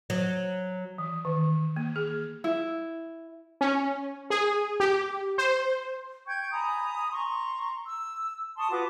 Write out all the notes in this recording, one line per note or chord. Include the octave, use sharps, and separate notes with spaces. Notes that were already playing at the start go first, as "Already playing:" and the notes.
F#3
E3
D#3
A#3
G#4
E4
C#4
G#4
G4
C5
G5 C#6 G6 G#6
G#5 A#5 B5 D#6
A#5 C6 C#6
E6
A5 C6 C#6 D#6
F4 F#4 B4 D6